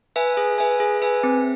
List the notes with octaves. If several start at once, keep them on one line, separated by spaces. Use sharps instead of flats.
B4 E5 G#5
G#4
B4 E5 G#5
G#4
B4 E5 G#5
C4